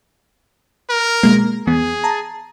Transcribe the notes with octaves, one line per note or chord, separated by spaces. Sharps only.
A#4
B2 G#3 A#3
E2 B3 G#4
A5 A#5